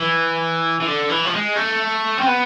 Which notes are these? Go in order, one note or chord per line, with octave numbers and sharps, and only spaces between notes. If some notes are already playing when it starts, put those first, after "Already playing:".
Already playing: E3
E3
D3
E3
F3
G#3
A3
C4
B3